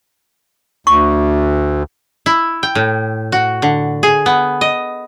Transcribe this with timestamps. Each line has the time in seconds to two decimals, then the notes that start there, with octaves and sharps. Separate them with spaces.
0.87 D2 C#6
2.26 E4
2.63 G5
2.75 A2
3.32 F#4
3.62 D3
4.03 G#4
4.26 B3
4.61 D#5